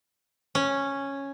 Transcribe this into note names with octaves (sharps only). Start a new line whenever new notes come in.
C#4